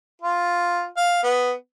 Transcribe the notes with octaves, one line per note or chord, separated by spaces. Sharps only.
F4
F5
B3